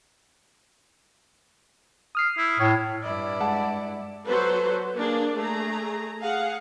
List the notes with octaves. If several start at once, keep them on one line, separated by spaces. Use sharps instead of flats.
D#6 F6 C7
E4
A2 C#5
G2 E4 D5
G#3 F#5 A5
F#3 A4 B4 C5
A#3 D4 G#4
A3 G#4 A#5
G#4 F5 F#5